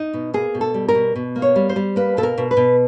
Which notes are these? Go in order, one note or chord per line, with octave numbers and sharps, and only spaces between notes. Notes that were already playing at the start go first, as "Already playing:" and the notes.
Already playing: D#4
B2
A#3 G#4
B2
A4
G3
A#4
B2
B2
A#3
C#5
G3
C5
G3
A#3 B4
B2 A4
A#4
B2
B4
B2